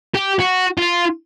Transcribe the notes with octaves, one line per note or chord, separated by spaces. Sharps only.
G4
F#4
F4